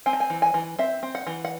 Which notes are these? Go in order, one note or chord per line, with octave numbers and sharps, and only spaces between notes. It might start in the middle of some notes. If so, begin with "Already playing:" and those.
C4 G#5
A5
G#5
E3
G#5
E3
C4 E5
C4
F#5
E3
F#5